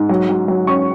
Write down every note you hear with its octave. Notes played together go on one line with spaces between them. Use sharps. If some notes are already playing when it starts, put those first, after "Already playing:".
Already playing: G#2
F#3
F#3
F#3
C#4 C#6